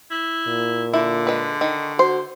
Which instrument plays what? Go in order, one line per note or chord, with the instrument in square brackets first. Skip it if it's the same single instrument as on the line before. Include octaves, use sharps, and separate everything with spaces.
[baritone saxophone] E4
[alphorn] A#2
[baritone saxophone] D3 [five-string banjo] E4
[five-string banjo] G#3 B4
D#3
[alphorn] F#4 [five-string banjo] C5